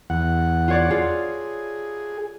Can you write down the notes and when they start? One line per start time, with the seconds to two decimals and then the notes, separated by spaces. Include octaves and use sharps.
0.10 E2 F#5
0.68 F4 C#5 D5
0.90 F4 G#4